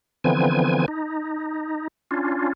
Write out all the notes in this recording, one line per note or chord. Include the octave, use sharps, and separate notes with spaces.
D3 E3 F3 B3 C4 G#5
D#4
C#4 D4 F4